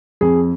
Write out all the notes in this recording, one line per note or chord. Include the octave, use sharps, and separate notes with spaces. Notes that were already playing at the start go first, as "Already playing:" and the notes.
F2 G#4